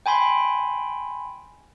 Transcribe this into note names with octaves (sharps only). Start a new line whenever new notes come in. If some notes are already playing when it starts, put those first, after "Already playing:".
G5 G#5 B5 C6